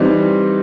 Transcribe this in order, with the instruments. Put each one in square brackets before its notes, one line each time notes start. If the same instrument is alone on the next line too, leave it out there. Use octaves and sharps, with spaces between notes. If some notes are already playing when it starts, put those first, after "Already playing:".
Already playing: [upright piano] E3 G3 C4 D#4